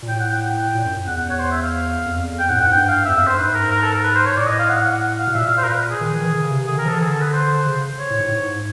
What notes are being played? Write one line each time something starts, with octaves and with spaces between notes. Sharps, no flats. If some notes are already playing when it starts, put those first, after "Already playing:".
A#2
A2 G5
F#5
G5
A#2
F#2
E2 F#5
F#5
C#5
C5
E5
F5
F2
E2
F2 G5
A2 F#5
F2 F#5
G#2
G2 G5
F5
E5
E2
F2 E5
F#2
C5
G2
G#2 B4
A#4
A#4
A4
A#4
B4
C5
C#5
A2 D5
D#5
F5
F#5
F#5
F#5
F5
B2
A#2 E5
F5
C5
A#4
B4
G#4
D#3
E3
D#3
C#3
C3
D3 G#4
D#3 A#4
F3
E3 A4
D3 G#4
A4
B4
C5
C#3
C#5
A2
G#2
A2
G#2